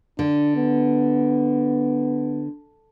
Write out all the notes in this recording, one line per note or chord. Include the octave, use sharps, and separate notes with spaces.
D3 D4
B3